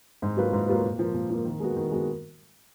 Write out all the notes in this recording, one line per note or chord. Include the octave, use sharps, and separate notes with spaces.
G#2
F#3 A#3 F4 B4
G#2
F#3 A#3 F4 B4
A#2
F3 A#3
A#2
F3 A#3
D#3
G#3 B3 F#4
D#3
G#3 B3 F#4